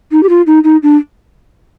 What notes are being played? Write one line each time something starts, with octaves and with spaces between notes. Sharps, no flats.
D#4
G4
F4
D#4
D#4
D4